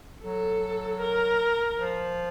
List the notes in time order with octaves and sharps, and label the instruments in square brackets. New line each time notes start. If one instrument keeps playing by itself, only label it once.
[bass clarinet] F#3 [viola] A4
[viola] A#4
[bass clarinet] F3